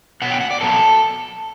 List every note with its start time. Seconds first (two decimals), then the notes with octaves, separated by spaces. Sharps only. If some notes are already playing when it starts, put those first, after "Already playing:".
0.22 B2 F#3 B3 F#5
0.31 G5
0.41 F#5
0.51 D5
0.61 B2 F#3 B3 A4